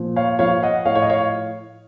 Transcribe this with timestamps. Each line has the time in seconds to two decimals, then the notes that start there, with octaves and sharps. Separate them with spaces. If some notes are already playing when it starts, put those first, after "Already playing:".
Already playing: A#2 F3
0.16 C#5 F5
0.39 F3 C#5 F5
0.63 D#5 F#5
0.85 A2 C#5 F5
0.95 C#5
1.02 D#5
1.10 C#5 F5